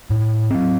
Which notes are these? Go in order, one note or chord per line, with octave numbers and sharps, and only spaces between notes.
A2
F#3 C4